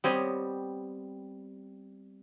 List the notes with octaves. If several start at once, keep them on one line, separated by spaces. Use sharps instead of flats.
G3 B3 C4 G4 C#5 D#5